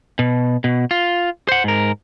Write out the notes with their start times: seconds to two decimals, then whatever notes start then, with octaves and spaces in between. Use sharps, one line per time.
0.19 B2
0.64 B2
0.91 F4
1.49 C5 F#5
1.64 G#2 A#4